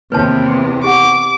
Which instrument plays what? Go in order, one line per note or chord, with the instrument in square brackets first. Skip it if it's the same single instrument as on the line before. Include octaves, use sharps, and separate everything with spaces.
[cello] E2 C3 [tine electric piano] D#3 A#3 [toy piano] B4 C#5 A5
[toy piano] G4 F#5 [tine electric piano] C#6 [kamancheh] D6